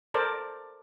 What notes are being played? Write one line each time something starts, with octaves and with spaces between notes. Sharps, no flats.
A4 A#4 C5 D5